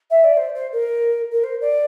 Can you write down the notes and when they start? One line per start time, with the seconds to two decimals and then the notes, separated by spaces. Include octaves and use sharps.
0.10 E5
0.24 D5
0.37 C5
0.55 C5
0.72 A#4
1.32 A#4
1.44 C5
1.61 D5